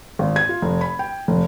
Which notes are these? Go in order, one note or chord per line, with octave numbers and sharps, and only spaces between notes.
G#1
G#6
F4
F1
B5
G5
F1